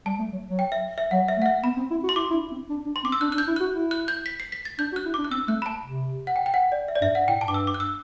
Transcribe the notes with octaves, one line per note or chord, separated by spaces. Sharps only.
G3 A5
A3
F#3
F#3
G5
E5
E5
F#3 F#5
E5
A3
F#5
E5
B3 B5
C4
E4
F#4
C6
E4 D6
E4
D4
C4
D4
D4
C6
C4 D6
E6
D4 F#6
D4 F#6
G6
E4
F#4 F#6
E4
F#6
G6
B6
C7
B6
A6
D4 G6
F#4
F#6
E4
D4 D6
F#6
C4 E6
A3 F#6
B5
A5
C3
F#5
G5
G5
F#5
D5
E5
D5
G2 E5
F#5
A2 G5
G2 A5
D6
E6
D6
F#6
E6